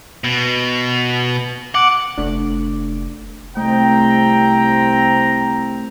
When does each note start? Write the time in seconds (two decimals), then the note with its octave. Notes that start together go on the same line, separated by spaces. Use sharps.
0.24 B2
1.75 F#5 D6
2.18 F1 A3 D4
3.57 C2 A3 C4 G5 A#5